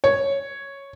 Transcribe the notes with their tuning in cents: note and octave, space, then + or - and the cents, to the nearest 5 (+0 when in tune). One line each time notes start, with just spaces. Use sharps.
C#5 +0